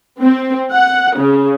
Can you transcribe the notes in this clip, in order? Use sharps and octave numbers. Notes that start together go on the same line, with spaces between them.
C4
F#5
C#3